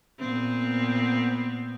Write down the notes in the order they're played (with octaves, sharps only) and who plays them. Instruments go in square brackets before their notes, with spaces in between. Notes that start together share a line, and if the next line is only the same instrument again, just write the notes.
[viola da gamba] A#2 B3 C4